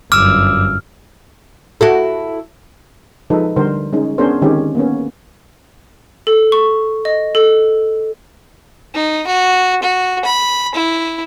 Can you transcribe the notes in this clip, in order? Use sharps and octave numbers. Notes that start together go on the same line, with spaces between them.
G1 F#2 D6 E6 F6
E4 F#4 A4
F3 G#3 D#4 A4 B4
D3 G3 A#4 C5
G#3 C#4 D#4
B3 C#4 D4 G#4 A#4 C5
D3 D#3 G#3 C4 C#4 G4
A#3 B3 C#4
A4
C#6
D#5
A4
D#4
F#4
F#4
B5
E4